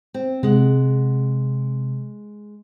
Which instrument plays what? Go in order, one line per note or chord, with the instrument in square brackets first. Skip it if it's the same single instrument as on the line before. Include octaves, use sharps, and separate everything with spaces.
[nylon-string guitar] C4
[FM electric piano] C3 [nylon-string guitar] G#3 F#5